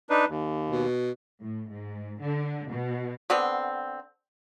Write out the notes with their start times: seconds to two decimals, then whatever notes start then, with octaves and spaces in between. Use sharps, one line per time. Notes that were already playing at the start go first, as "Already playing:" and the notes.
0.10 D4 D#4 B4
0.29 D#2
0.70 B2
1.42 A2
1.71 G#2
2.22 D3
2.70 B2
3.30 D3 B3 C4